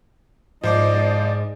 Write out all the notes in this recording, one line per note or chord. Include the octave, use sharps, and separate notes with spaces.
G#2 F3 C5 D5 D#5 D6